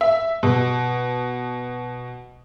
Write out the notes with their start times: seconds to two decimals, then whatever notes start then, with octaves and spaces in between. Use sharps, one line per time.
0.01 E5
0.43 B2